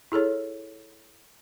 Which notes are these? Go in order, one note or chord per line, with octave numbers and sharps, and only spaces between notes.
E4 G#4 A4 C#5